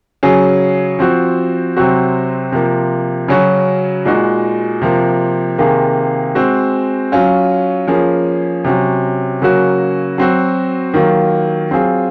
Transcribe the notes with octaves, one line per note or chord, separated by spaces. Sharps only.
C#3 F#3 C#4 G#4
F3 C4 F#4
C3 F#3 C4 F#4
C3 F3 A#3
C#3 F#3 C#4 F#4
A#2 G#3 D#4 F#4
C3 F3 A#3
C3 D#3 A#3 F4 G#4
G#3 C4 F#4
F#3 C#4 F4
F3 A#3 C#4 G#4
C3 F#3 C#4 F#4
C#3 F#3 A#3 C#4 F#4
F#3 C4 F#4
D#3 F#3 A#3 F4
F#3 C4 F4 G#4